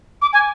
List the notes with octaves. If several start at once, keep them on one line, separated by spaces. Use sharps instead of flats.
D6
G#5